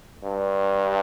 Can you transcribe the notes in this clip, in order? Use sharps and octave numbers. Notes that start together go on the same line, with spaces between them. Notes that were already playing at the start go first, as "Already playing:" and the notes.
G2